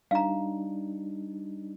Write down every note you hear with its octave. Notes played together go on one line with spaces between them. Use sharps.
G3 D4 D#4 F5 A#5